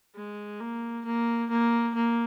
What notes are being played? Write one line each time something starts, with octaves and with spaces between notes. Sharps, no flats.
G#3
A#3
A#3
A#3
A#3